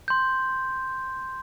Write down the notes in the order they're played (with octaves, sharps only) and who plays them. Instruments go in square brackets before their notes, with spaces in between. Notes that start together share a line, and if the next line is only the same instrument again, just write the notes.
[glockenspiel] C6 G6